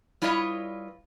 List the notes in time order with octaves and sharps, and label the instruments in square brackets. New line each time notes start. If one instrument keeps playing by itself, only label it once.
[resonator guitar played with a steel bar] G3 E4 F4 B4 C#5 D#5